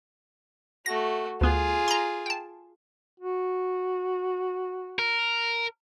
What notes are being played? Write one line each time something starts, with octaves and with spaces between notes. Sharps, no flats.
A3 F#4 A#6
D2 B3 F4 G#4
A#5 C6
G5 A5
F#4
A#4